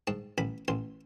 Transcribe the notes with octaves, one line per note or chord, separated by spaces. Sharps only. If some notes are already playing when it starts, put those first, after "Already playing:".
G#2 A5
A1 B5
A1 C6